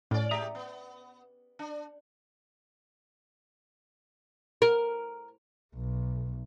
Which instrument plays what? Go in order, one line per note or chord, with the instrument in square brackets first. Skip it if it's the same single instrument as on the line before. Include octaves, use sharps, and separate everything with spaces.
[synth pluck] A2 [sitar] C#4 D5
[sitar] G#3 G4 [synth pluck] E5 A#5 D#6
[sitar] B3
D4
[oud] A#4
[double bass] B1